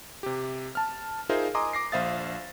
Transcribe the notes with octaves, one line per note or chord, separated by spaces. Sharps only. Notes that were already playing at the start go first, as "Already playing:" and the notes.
C3 G4
A5 F6
D#4 F4 G#4 A#4 C5 E5
D#5 G#5 A#5 C6 D6 D#6
D6 A#6 C7
A#1 C5 E5 F5 D#6 A6